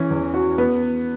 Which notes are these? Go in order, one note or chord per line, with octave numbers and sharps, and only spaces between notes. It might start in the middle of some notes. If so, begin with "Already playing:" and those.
Already playing: E3 C#4
E2
F#4
B3